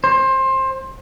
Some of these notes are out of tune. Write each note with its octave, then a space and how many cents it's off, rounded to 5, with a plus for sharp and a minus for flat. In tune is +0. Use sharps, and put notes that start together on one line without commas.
C5 +20